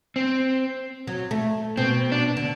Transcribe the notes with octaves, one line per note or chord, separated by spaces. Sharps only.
C4
F#3
A3
B2 C4
D4
D3